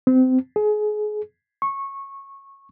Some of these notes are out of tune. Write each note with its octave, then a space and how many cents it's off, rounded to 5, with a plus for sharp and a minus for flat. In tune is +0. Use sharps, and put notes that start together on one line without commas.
C4 -25
G#4 +30
C#6 -15